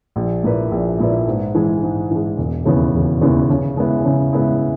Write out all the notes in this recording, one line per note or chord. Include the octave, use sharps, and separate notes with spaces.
A#1
A#2 A#3 E4 B4
A#1
A#2 A#3 E4 B4
G#2
E3 G#3
G#2
E3 G#3
E1
D#2 C#3 E3 B3
E1
D#2 C#3 E3 B3
C#3
G#3 B3 E4
C#3
G#3 B3 E4